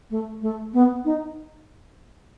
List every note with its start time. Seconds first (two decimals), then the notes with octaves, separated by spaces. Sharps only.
0.11 A3
0.42 A3
0.74 B3
1.05 D#4